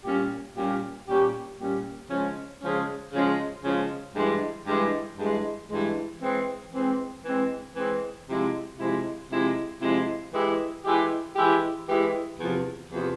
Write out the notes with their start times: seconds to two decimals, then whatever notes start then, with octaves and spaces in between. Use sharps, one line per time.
0.04 A#2 G3 C#4 G4
0.55 A#2 G3 C#4 G4
1.07 A#2 G3 C#4 G4
1.59 A#2 G3 C#4 G4
2.10 C#3 F3 G#3 C#4
2.61 C#3 F3 G#3 C#4
3.13 C#3 F3 G#3 C#4
3.64 C#3 F3 G#3 C#4
4.16 G2 E3 G#3
4.67 G2 E3 G#3
5.18 G2 E3 G#3
5.70 G2 E3 G#3
6.21 E3 G#3 C4
6.73 E3 G#3 C4
7.24 E3 G#3 C4
7.76 E3 G#3 C4
8.28 C3 F3 G#3 E4
8.78 C3 F3 G#3 E4
9.30 C3 F3 G#3 E4
9.81 C3 F3 G#3 E4
10.33 E3 G#3 E4 G4
10.84 E3 G#3 E4 G4
11.36 E3 G#3 E4 G4
11.88 E3 G#3 E4 G4
12.39 E2 C3 F3
12.90 E2 C3 F3